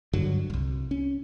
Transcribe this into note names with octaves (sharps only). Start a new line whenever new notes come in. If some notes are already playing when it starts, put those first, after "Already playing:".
G2 D3 F#3
E1 C2
C#4